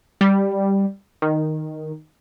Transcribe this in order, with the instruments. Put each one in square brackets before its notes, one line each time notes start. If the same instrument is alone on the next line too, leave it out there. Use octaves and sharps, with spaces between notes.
[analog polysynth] G3
D#3